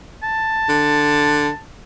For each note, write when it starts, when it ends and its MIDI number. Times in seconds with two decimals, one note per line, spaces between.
0.23 1.60 81
0.69 1.49 50